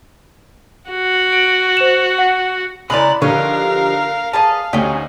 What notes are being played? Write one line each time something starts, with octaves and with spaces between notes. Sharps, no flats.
F#4
D7
C5 E7
F#5
C#3 G#3 E4 B4 D5 A#5 B5 F#6
D3 F3 D#4 G4 A#4 C#5 F5
G#4 B4 D#5 F5 A5
D2 C#4 D#4 G4